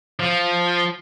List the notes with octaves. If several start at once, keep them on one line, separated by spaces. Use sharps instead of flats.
F3